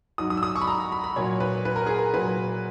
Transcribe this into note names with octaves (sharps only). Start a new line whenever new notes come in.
G#2 F#3 D#6
D#6
E6
D#6
C#6
B5
A#5
B5
B5
A#2 F#3 C#5
B4
B4
A#4
G#4
A#4
A#2 F#3 B4